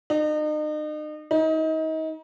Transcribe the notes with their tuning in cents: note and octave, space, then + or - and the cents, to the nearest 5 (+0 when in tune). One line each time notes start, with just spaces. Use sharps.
D#4 -40
D#4 +30